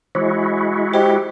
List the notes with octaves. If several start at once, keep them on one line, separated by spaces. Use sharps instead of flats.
E3 G#3 E4 F#4
G4 C5 D#5